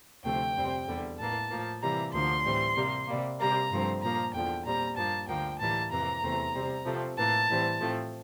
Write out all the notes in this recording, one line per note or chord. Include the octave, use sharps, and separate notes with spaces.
D2 C3 F3 A3 C4 G5
F2 C3 G3 C4
E2 D3 G3
A2 E3 A#3 A5
A2 F3 A#3
C3 E3 G3 A#3 A#5
D2 D3 F3 A#3 C6
A2 E3 G3 C4
C3 G3 A#3
C3 G3 A#3
C3 G3 A#3 A#5
G2 F3 A3 C4
A#2 F3 A#3 A#5
E2 D3 F3 G5
A#2 G3 C4 A#5
G2 F3 A#3 A5
D2 D3 F3 A#3 G5
A2 E3 G3 A#3 A5
F2 C3 E3 A#3 A#5
E2 C3 E3 A3 C4
C3 G3 C4
C3 F3 A3 C4
A2 E3 A#3 A5
A2 E3 G3 C4
A2 F3 A3 C4